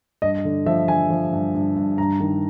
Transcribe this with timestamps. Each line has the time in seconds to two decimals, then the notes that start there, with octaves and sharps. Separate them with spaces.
0.22 G2 D#5
0.45 D3
0.66 F3 E5
0.88 D3 G#5
1.10 F3
1.33 G2
1.54 G2
1.76 G2
1.98 G2 A#5
2.20 D#3